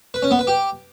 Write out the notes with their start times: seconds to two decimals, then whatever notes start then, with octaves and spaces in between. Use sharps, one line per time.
0.14 B4
0.22 C#4
0.31 B3
0.39 B4
0.47 G4